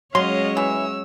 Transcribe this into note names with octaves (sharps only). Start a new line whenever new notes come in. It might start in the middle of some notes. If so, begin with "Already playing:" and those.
F#3 G#3 C#4 C#5 D#5 F5 C6
E3 E6